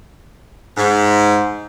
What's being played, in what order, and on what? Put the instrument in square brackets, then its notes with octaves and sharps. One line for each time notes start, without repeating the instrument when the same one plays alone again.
[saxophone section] G#2